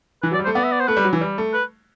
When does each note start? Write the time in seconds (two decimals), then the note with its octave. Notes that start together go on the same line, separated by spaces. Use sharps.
0.23 E3 B4
0.32 F#3 D5
0.39 G3
0.45 A3 C5
0.55 B3 D5
0.64 E5
0.72 D5
0.80 C5
0.88 A3 B4
0.97 G3
1.05 F#3
1.13 E3
1.21 G3
1.38 A3
1.54 B4